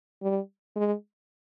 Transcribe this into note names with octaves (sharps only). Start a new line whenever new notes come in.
G3
G#3